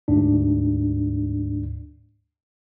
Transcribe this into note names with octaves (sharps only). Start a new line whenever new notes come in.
D2 G#2 D4